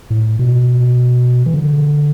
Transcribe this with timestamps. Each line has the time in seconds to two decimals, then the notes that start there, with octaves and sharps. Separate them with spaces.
0.10 A2
0.39 B2
1.46 E3
1.54 D3